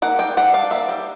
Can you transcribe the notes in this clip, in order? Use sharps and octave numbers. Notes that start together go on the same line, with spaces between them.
A#3 F#5
G3 G5
G3 F#5
D4 F5
A#3 E5
G3